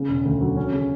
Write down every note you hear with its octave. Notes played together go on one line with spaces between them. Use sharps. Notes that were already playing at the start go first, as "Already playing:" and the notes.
Already playing: C#3
E1
D2
F#3
C#4
C#3